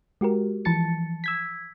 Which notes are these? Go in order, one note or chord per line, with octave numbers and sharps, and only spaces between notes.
G#3 F#4 G4 A#4
E3 F3 A5 A6 C#7
E6 G#6 B6